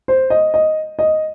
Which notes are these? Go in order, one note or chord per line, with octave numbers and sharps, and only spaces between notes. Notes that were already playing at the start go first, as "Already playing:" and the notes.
C5
D#5
D#5
D#5